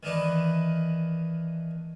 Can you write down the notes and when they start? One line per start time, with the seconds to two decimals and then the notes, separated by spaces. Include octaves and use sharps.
0.03 D#3 E3 D4 D#4 B4